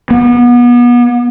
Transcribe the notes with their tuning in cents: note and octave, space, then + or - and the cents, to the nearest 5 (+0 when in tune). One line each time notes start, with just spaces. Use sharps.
B3 -30